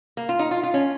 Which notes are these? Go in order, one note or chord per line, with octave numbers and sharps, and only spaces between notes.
A#3
F4
D#4
F4
F4
C#4